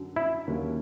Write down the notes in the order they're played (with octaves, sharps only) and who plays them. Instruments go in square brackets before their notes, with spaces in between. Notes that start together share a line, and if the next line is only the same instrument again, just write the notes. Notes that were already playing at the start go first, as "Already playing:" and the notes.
Already playing: [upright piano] F#2 D3 F#3
[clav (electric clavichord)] E4
[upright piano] D#2 D3 F#3 A#3 C#4